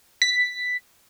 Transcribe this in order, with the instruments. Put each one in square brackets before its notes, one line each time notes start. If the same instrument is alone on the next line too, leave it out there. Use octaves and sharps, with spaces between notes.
[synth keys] B6